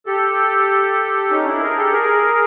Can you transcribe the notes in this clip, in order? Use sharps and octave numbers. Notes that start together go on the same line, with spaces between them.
G4 A4
C#4 D#4
D4 E4
G#4 A#4
G4 A4
G#4 A#4